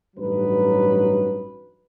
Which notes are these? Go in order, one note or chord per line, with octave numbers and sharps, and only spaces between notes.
A1 G2 F#3 D#4 B4